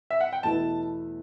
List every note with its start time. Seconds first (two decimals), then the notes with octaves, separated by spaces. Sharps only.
0.10 E5
0.21 F#5
0.33 G5
0.43 E2 B2 A3 E4 B4 A5